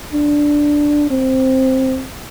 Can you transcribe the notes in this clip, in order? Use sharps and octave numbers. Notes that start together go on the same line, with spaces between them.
D4
C4